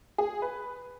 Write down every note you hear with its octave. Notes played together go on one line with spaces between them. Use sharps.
G#4
B4